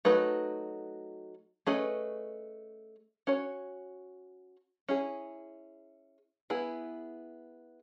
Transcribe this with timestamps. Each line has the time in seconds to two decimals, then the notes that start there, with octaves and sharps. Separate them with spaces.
0.05 F#3 A3 D#4 F#4 B4
1.67 A3 C#4 G#4 B4 D#5
3.27 C#4 F#4 C#5
4.89 C#4 E4 G#4
6.50 B3 E4 G#4